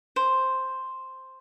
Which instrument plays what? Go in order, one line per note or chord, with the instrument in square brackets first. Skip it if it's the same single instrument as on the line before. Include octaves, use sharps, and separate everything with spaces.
[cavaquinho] C5